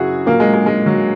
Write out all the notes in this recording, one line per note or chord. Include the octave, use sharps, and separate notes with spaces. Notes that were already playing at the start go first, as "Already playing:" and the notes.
Already playing: F#2 C#3 F#3 E4 F#4 G#4
A#2 F#3 A#3
G#3
G#3
G#3
F#3